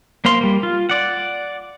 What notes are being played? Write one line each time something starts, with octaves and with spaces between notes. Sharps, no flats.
A#3 C5 F5 C6
G3 A#3
F4
D5 F#5